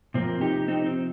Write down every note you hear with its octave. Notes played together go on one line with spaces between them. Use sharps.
C3 F3 A#3 C4
D#4 G4
C4 D#4
C4